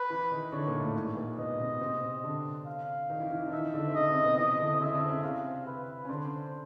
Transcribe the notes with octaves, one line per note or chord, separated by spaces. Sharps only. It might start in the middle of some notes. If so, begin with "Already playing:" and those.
Already playing: B4
E3 E4
D#3 D#4
D3 D4 C#5
A#2 A#3
A2 A3
G#2 G#3
A#2 A#3
B2 B3 D#5
C3 C4
C3 C4
D3 D4
F5
D#3 D#4
E3 E4
E3 E4
E3 E4
D4
D#3 D#4 E5
D3 D4
C4
C#3 C#4 D#5
C3 C4
B2 B3
E3 E4 D#5
D3 D4
C4
C#3 C#4 E5
D3 D4
C4
C#3 C#4
C3 C4 F5
B4
C#4
D3 D4 C5